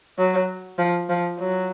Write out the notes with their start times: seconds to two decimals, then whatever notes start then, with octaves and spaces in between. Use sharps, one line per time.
0.19 F#3
0.79 F3
1.09 F3
1.40 F#3